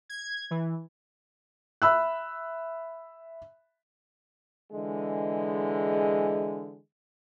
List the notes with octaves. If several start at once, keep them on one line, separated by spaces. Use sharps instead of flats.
G#6
E3
E5 B5 E6 F#6
D3 E3 G#3